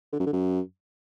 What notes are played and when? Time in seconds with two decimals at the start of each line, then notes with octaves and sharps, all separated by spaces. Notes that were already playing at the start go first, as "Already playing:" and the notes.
0.13 D3
0.20 F#2
0.26 D3
0.33 F#2